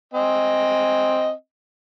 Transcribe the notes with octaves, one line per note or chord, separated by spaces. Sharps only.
C4 D#5 G#5